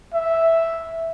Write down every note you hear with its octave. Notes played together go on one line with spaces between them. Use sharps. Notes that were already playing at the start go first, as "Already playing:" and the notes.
E5